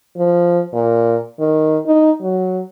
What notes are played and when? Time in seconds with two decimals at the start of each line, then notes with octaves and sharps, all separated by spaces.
0.18 F3
0.74 A#2
1.40 D#3
1.87 D#4
2.21 F#3